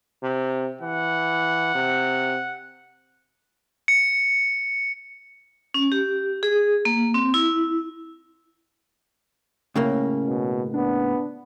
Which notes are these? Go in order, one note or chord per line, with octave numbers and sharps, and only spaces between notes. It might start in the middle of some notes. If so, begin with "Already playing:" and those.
C3
E3 F#5
C3
C#7
C#4
G4
G#4
A#3
C4
E4
A2 C#3 A#3 C#4
B2
B3 D4